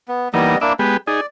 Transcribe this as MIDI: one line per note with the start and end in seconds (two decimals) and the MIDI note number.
0.08 0.28 59
0.34 0.56 52
0.34 0.58 55
0.34 0.56 58
0.34 0.58 59
0.34 0.56 63
0.34 0.58 75
0.61 0.73 58
0.61 0.73 62
0.61 0.73 64
0.61 0.73 74
0.61 0.73 76
0.79 0.97 56
0.79 0.97 59
0.79 0.97 67
0.79 0.96 71
1.07 1.21 63
1.07 1.21 68
1.07 1.26 74